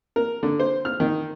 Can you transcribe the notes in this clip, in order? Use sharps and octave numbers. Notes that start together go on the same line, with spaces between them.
A#4
D3
C5
F6
D#3